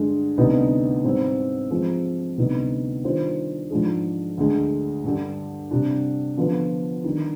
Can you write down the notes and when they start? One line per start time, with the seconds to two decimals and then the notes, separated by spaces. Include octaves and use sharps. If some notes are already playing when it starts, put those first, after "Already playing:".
Already playing: G2 D3 G#3
0.38 D2 C3 G3 B3 D#4
1.04 G#2 G3 C4
1.70 F3 G#3 C4
2.37 D2 C3 G3 B3 D#4
3.04 D#3 G3 D4 F4 C5
3.70 G#2 F3 G#3 D4 G#4
4.38 D2 D3 G#3
5.04 G2 D3 G3
5.71 C3 G3 D4
6.37 D3 F3 B3 F4
7.04 D#3 G3 D4